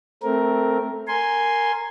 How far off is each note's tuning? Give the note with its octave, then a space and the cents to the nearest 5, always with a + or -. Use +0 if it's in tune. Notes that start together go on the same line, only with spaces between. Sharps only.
A3 +0 C4 +0 A#4 +10
A#4 -10 G#5 +0 C6 +0